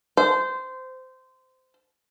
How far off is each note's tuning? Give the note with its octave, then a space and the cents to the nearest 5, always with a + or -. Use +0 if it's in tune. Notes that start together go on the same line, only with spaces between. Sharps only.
C5 -20